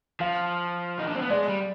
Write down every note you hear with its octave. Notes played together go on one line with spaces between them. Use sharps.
F3 F5
D#4
D4
C4
B3
G#3 D5
G3